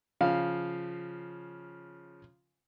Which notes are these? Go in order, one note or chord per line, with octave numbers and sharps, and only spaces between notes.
C#3 F3 F5